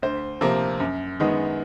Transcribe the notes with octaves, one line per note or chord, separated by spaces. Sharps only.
D2 C5
C3 F3 A#3
F#2
D#3 G#3 B3